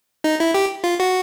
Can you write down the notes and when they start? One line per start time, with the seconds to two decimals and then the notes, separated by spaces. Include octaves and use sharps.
0.24 D#4
0.40 E4
0.54 G4
0.84 F4
1.00 F#4